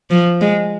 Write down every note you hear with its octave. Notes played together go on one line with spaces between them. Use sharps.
F3
G#3